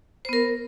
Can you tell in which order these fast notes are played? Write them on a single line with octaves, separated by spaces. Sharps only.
C5 B3 A#4